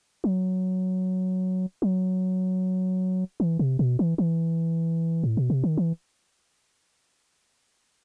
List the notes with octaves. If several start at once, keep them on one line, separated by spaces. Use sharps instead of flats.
F#3
F#3
E3
C3
B2
E3
E3
A2
B2
C3
D#3
E3